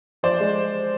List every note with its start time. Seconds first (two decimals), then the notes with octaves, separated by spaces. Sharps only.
0.23 F3 C5 D5
0.40 G#3